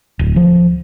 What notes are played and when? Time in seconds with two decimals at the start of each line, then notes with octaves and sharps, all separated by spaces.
0.19 D1
0.36 F3